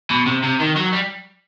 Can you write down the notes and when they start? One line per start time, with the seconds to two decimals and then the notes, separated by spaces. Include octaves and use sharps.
0.10 B2
0.26 C3
0.43 C3
0.60 D#3
0.76 F#3
0.93 G3